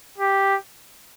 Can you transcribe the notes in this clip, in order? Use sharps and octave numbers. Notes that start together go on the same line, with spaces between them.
G4